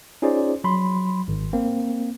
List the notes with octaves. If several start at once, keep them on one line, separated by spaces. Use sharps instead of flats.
C#4 D#4 F4 G#4 C5 D5
F#3 B5 C6
G#1
A#3 C4